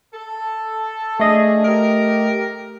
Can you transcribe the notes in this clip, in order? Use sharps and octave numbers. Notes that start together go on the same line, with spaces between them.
A4
A3 D4 G#4 D#5
G4 A#4